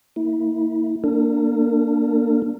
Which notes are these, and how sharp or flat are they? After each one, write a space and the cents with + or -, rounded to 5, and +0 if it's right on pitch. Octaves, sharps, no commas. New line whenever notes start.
A#3 -20 E4 -30
A#3 +0 D4 +0 A#4 -35